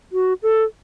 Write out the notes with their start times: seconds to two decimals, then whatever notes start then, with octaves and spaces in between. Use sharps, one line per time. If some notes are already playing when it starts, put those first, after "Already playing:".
0.12 F#4
0.43 A4